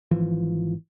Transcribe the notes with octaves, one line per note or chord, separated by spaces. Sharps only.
G#1 E3 F3